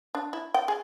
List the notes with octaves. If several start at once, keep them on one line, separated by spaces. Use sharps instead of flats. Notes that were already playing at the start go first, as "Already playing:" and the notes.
D4
E4
G5
G#4